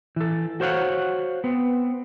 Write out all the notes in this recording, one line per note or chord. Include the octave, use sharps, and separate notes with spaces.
E3 A4
F#4 C5 C#5 F5 F#5
B3 C4